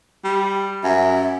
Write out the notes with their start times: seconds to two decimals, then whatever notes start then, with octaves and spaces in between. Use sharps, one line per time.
0.24 G3
0.84 F#2 E5